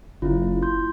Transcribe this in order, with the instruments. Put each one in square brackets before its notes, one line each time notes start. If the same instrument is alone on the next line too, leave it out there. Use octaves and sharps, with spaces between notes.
[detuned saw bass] F#1 [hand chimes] E4 F4
[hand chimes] C6 G6